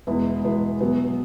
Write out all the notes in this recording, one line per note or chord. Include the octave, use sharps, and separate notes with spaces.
E2 B2 G#3 B3 E4
E2 B2 G#3 B3 E4
B2 F#3 B3